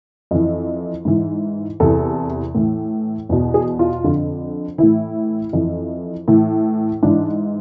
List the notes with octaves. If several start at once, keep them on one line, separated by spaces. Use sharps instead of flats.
F2 E3
G#2 E3
E2 C3 E3 A4
A2 E3
E2 B2
G#4
F4
F2 D3
A2 E3 E4
F2 E3
A2 E3
G#2 E3 D4